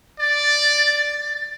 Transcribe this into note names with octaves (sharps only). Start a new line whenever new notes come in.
D5 A6